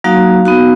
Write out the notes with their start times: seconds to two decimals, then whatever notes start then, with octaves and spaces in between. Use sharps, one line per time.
0.04 F#3 A#3 D#4 F#4 F5
0.45 B3 D#4 F#4